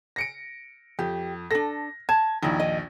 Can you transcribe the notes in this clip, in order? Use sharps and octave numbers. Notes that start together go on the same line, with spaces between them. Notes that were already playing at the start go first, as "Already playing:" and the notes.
A#6 C#7 D7
F2 G4
D4 A4 A#6
A5 G#6
A#1 D#2 D#4 E4
D#5